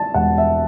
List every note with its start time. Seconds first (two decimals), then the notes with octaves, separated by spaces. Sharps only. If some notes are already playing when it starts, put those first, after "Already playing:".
Already playing: G3 A5
0.14 E1 F#5
0.38 E5